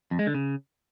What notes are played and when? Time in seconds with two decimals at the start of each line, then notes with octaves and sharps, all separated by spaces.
0.11 F2
0.19 G#3
0.27 D3
0.34 C#3